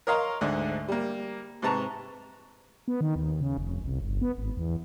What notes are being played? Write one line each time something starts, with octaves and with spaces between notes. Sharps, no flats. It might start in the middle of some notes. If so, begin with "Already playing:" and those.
A#4 C#5 D#5 F5 A#5 C6
D2 G#2 D3
G3 A#3
G#2 C3 B4 A5 A#5 C#6
B3
D#3
D#2
C#3
F1
C2
G1
B3
G#1
E2